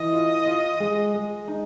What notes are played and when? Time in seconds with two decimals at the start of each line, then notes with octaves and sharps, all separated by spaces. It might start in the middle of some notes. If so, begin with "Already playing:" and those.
Already playing: E3 D#5
0.13 F4
0.46 F4
0.80 G#3
1.14 G#3
1.48 D#4